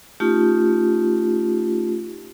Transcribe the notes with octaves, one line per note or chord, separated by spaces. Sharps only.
A3 C#4 D#4 F4 G4